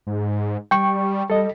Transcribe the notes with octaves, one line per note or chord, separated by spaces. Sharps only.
G#2
G3 G5 C#6
G3 A4 D#5